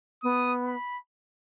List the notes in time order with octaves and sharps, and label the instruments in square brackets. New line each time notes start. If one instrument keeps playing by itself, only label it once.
[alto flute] B3 [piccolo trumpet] D#6
[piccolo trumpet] B5